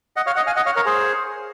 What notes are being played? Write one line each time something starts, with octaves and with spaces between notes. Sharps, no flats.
D#5 F#5
C#5 F5
D#5 F#5
F5 G#5
D#5 F#5
C#5 F5
A#4 C#5
G#4 C5